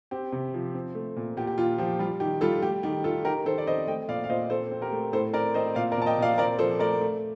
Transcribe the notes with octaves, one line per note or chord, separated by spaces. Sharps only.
C4 G4
C3
F3
C4
A3
A#2
A#2 G4
G4
A#2 F4
F3 G4
G3 F4
D#3 G4
G3 F4 A4
A3 G4
D#3 G4
D#3 F4 A4
D#3 G4 A#4
D#3 A4 C5
D5
C4 C5 D#5
A3 D#5 G5
A#2 D5 F5
F5
A#2 C5 D#5
C4 A4 C5
C4
G4 A#4
A3
A2 A4 C5
C4 A#4 D5
C4 C5 D#5
A#2 D5 F5
A#4 D5
A#2 A5
D#5 G5
A#2 D5 F5
C4 A#4 D5
F3 A4 C5
A3 A#4 D5
A3